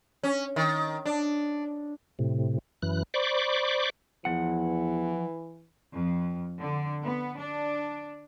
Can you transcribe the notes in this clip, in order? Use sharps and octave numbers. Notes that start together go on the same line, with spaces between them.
C#4
D#3
D4
A2 C3
F#2 E3 F#6
C5 D5 B5 C#6 D6
E2 E3 F3 F#5
F2
D3
B3
D4